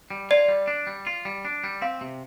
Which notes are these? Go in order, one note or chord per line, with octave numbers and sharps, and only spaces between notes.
G3
F4 D5
G3
D4
G3
F4
G3
D4
G3
C4 F5
C3